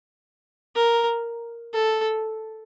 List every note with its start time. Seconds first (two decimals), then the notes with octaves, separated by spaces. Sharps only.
0.75 A#4
1.74 A4